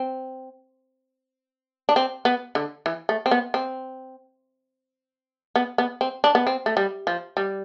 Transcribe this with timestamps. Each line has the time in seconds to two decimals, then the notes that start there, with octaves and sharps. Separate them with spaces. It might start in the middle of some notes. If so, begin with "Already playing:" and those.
Already playing: C4
1.89 D4
1.96 C4
2.25 B3
2.55 D3
2.86 E3
3.09 A3
3.26 C4
3.31 B3
3.54 C4
5.56 B3
5.78 B3
6.01 C4
6.24 D4
6.35 B3
6.47 C4
6.66 A3
6.77 G3
7.07 F3
7.37 G3